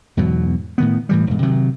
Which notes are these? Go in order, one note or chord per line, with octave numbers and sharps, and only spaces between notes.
E2 G#2 B2 F#3
A2 D#3 B3
A2 E3 G3
E1 G#2
C3 D#3 F#3